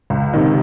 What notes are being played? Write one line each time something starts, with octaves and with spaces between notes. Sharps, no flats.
C#2
C3 D#3